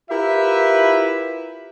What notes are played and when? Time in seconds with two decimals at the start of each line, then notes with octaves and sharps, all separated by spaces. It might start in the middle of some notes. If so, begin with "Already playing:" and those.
0.10 E4 F4 G4 A#4 B4 E5